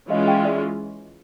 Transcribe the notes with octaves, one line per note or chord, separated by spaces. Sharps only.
E3 G#3 C#4 F4 D#5 F5
F5 G5
D5 E5